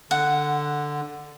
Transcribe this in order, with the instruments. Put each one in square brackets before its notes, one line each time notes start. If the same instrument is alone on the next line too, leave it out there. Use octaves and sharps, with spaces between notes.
[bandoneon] D3 [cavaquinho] F#5